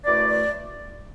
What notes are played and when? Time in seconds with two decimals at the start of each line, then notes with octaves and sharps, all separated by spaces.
0.04 F#2 E3 A3 D5
0.29 D5